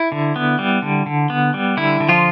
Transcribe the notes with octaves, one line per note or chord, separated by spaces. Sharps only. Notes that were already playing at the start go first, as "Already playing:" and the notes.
Already playing: E4
D3
B3
G3
D3
D3
B3
G3
D3 E4
D3
F3 F4